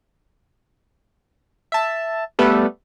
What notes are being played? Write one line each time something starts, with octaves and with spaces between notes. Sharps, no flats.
E5 A5
G3 A3 B3 A4 B4